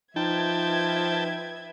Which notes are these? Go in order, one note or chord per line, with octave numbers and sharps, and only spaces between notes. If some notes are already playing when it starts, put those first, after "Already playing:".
F3 D#4 B4 E5 G5 A5 G#6